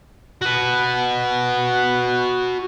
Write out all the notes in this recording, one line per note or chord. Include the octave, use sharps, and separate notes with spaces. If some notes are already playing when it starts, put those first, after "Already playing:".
F#4 B4